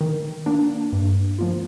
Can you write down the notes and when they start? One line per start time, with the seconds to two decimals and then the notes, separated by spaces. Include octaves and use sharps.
0.01 D#3
0.46 A#3 D4
0.93 G2
1.39 F3 A#3 F4